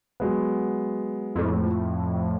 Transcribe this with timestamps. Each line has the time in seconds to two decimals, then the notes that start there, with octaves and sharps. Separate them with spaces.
0.20 F#3 G#3 B3
1.36 F2 A2